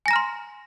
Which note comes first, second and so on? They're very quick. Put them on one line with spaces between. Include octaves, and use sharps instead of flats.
G#5 A#6 A#5 F6 C6